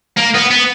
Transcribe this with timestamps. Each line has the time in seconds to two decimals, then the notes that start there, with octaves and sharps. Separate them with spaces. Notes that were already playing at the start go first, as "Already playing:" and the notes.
0.17 A#3
0.35 B3
0.51 B3